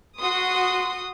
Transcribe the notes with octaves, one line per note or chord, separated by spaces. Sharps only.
F#4 C6 D#6